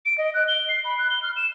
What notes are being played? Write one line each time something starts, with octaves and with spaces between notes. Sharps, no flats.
D7
D#5
F#6
G7
C7
B5
F#6
G7
F6
E7